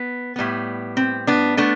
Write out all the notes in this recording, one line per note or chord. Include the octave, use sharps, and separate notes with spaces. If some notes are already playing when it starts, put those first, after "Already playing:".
Already playing: B3
A2 G3 B3
C4
B3 D4
A3 B3 D4